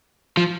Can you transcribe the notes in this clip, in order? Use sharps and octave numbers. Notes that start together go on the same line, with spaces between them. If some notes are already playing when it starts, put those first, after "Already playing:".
F3